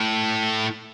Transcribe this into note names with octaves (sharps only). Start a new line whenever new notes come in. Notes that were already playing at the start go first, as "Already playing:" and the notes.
Already playing: A2